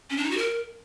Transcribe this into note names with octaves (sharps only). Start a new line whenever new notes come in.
C#4
D4
D#4
F#4
A#4